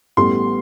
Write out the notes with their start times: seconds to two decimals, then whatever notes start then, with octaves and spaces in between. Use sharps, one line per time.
0.17 A1 A2 G3 B3 C6